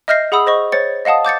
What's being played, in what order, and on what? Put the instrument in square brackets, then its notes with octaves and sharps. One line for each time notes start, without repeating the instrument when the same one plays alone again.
[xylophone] D#5 E5 F6 G6 A#6 C7
G#4 F#5 B5 D#6 E6
C5 D#5 C#6
C5 C#5 A6 C#7
D#5 F5 F#5 A5 D#6
D6 G6 A6 C#7